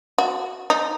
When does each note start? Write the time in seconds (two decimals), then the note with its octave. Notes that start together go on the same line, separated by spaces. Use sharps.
0.18 F#4
0.70 D#4